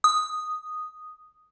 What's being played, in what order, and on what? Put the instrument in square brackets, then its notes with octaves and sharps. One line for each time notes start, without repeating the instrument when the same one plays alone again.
[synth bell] D#6